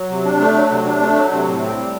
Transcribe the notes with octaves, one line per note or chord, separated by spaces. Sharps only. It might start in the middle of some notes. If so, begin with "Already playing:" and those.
Already playing: F#3
C3
D4
A3
F#3
C3
D4
A3
F#3
C3
A2
C4
G3